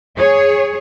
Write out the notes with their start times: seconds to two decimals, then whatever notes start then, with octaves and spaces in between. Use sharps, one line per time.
0.17 G#4 C#5